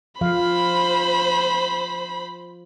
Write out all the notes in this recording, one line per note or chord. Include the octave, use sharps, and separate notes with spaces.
F3 C5 F5 B5